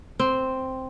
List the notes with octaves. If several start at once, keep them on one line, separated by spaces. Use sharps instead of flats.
C4